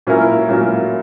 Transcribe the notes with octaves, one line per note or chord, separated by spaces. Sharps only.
A#2 F#3 C#4 E4 A#4
A#2 F#3 C#4 E4 A#4